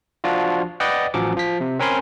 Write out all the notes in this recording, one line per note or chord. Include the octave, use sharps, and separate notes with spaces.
F3 D4 F4 F#4
B4 D5 D#5 F#5 G5
A1 F3 F#3 C#4 D6
F3 B6
C3
C4 C#4 A#4 G#5 B5 C6